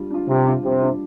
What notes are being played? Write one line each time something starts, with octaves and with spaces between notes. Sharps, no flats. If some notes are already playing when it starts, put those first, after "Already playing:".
Already playing: G3 D4 F4
D4 F4
C3 G3
D4 F4
C3 G3
D4 F4